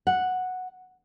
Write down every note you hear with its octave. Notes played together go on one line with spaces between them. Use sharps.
F#5